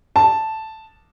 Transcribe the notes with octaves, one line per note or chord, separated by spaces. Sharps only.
A5